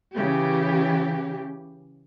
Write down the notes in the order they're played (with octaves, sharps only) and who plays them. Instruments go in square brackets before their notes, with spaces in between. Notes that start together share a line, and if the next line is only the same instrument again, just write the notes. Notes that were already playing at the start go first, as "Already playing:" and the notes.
[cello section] C#3 E3 G4